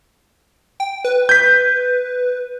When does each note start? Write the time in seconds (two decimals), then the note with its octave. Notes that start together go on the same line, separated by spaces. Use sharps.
0.80 G5
1.05 B4
1.29 G6 B6